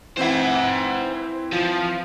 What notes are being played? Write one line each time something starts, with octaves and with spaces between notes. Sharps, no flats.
E3 C4 E4 C5 F#5
F3